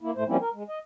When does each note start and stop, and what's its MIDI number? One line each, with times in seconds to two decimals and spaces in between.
0.01 0.11 58
0.01 0.11 64
0.16 0.24 45
0.16 0.24 57
0.16 0.24 72
0.28 0.37 53
0.28 0.37 55
0.28 0.37 58
0.28 0.37 60
0.28 0.37 61
0.28 0.37 64
0.41 0.49 70
0.54 0.63 56
0.69 0.79 75